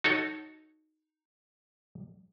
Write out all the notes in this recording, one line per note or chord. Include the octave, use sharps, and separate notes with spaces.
D#4 F#4 A4 C#5